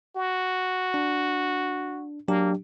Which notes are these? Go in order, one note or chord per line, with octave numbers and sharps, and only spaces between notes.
F#4
D4
F#3 A#3 D4 G4